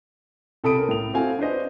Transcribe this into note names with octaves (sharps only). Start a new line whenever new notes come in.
C3 A4 B5 D#6 D7
C#4 A#4
A2 F7
C4 E4 F#4 A4 F5 G#5
D4 B4 C5 D#5